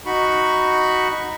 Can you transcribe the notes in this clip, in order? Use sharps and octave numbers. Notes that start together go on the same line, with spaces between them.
D#4 F#4 B5 C#6